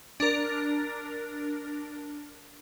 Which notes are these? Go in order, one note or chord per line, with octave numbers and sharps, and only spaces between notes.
D4 A#4